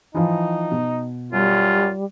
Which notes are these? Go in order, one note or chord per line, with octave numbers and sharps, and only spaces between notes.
E3 F3 D#4
B2
F#2 G3 F4